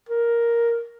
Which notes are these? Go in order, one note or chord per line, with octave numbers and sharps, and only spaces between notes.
A#4